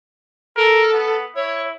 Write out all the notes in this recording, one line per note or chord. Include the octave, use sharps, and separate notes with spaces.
A4 A#4
B3
E4 C#5